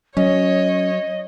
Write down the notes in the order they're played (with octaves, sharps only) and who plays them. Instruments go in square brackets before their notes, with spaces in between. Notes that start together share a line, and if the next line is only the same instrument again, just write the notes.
[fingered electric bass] F#3 [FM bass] C#4 [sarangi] C#5 [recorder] D#5